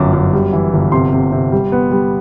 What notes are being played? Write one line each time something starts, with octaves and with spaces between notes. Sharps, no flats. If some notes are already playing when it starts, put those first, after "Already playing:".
Already playing: G1 F#2 D6
F#2
G3
E3
G1
C3 C6
C3
C3
G3
B3
G3